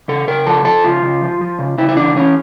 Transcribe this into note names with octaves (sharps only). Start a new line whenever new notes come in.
C#3 A4
C#3 A#4
F3 A4
F3 A4
C#3 F4
C#3
F3
F3
C#3
C#3 E4
E4
E3 D4
E3 C#4